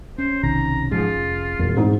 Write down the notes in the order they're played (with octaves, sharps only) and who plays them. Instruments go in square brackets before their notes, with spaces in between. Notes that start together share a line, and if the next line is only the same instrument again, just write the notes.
[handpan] C#4 [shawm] C5
[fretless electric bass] B1 C3 D#3 [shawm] A#5
[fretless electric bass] G#2 F3 [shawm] F4 [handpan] G#4
[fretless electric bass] F1
[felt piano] E1 [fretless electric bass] F2
[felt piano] G#2 D#4 [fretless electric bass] C4